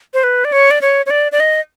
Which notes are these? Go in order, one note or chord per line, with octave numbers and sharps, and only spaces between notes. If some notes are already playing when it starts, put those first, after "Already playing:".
C5
B4
D5
C#5
D5
C#5
C#5
D5
D5
D#5